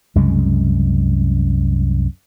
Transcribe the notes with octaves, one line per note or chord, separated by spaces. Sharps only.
C2 F#2 C#3 G#3